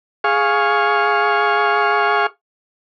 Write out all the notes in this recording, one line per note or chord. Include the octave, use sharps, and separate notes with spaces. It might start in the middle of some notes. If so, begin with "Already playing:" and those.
G#4 F5 C#6